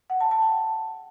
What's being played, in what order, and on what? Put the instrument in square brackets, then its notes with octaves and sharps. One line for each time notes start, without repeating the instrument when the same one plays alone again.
[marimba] F#5
A5
A5
G5